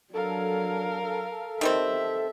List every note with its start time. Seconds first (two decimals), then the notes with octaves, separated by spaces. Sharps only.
0.14 F#3 D4 A4 A#4 F5
1.61 D#3 G3 C4 E5